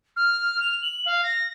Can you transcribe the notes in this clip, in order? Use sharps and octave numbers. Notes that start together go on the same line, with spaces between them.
F6
F7
F#7
F5
A#6